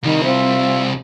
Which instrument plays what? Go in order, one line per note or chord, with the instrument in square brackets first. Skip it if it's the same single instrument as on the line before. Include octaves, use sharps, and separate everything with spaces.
[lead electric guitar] C2 G3 [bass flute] D#3
[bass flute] C4 [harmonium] F4 E5